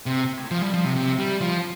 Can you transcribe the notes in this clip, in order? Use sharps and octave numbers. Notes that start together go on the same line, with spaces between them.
C3
F3
G3
F3
C3
C3
G3
F3